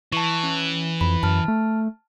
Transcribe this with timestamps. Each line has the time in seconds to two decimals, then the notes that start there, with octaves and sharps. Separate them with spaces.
0.13 E3 A5 C#6
0.43 C#4
1.01 F2 B5
1.23 F#2 A5 F6
1.48 A3